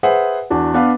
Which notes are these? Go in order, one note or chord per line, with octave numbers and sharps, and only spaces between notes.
G#4 B4 C5 E5 F#5
E2 D4 F#4
B3 D4 B4 F5 F#5